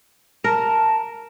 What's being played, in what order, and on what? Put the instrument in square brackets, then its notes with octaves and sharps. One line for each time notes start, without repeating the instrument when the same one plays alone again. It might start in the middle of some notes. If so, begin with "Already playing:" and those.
[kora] A#4 [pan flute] A5